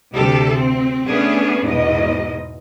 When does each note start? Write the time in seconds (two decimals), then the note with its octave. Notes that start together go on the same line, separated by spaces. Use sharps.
0.14 D2 C3 G4 A4
0.51 C4
1.07 A3 B3 C#4 D4 G#4
1.66 E2 G#2 B2 D#5